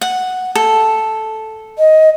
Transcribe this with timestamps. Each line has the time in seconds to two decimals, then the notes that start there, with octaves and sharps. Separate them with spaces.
0.01 F#5
0.55 A4
1.79 D#5